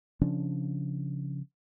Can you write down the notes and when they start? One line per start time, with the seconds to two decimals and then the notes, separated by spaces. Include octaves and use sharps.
0.21 C#3 F3 C#4 D4